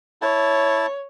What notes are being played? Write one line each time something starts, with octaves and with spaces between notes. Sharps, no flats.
E4 C#5 A5